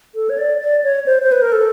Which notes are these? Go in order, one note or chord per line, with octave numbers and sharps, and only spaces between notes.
A4
C#5
D5
D5
C#5
C5
C5
B4
A#4
A4